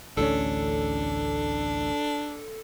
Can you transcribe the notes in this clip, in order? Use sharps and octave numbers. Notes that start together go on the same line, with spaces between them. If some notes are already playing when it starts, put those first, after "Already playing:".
A1 D2 C#4 D4 A4